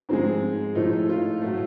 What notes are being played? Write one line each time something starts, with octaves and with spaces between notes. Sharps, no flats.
G#2 F3 G#3 C4
A2 F3 A3 D#4
F4
A2 F#3 A3